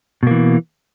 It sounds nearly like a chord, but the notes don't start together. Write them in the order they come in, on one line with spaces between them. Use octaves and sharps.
B2 A#3 E3